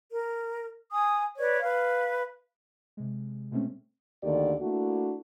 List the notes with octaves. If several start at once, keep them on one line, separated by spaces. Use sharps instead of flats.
A#4
G#5 D#6
B4 C#5 D5
B4 F5
C3 G#3
B2 G#3 A3 C4 C#4
D2 D3 D#3 A#3 G4 D5
A3 A#3 D4 E4 F#4